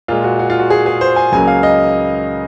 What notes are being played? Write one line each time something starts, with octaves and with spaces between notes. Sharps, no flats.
A#2 G#3 F4
F#4
F#4
F4
F#4
G#4
G#4
C5
G#5
C#2 C#3 F#3 A#3 G#5
F5
D#5